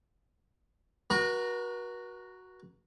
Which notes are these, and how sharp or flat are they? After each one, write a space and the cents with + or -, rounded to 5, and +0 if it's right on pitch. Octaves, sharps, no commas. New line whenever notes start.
F#4 +0 B4 -45 A#5 -10